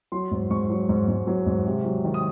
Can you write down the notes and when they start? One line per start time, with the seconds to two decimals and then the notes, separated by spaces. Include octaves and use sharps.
0.12 F#3 C6
0.31 G#2
0.51 G#2 C#6
0.70 F#3
0.89 G#2
1.08 G#2
1.27 F#3
1.46 G#2
1.66 C3
1.85 F#3
2.04 D#3
2.14 D#6